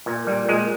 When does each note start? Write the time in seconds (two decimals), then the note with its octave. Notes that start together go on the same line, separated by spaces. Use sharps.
0.06 A#2
0.27 A#2 G3
0.49 A#2 G#3